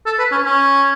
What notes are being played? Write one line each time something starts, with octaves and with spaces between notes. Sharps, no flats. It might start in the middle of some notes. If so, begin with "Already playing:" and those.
A4
B4
C#4
C#4